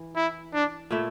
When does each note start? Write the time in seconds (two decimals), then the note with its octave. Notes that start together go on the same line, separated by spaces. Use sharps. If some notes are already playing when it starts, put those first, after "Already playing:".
Already playing: E3
0.16 E4
0.53 D4
0.91 A#2 A3 E4